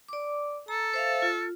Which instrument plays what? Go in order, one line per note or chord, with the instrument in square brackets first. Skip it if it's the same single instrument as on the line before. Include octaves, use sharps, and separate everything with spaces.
[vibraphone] D5 D6
[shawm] A4 [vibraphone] A#5
[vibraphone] C5 E5 F5
F4